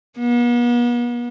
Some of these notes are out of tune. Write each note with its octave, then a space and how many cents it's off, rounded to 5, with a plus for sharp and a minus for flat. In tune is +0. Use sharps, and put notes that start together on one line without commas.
B3 -45